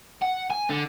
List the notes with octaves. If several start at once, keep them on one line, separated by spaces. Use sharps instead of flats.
F#5
G#5
D3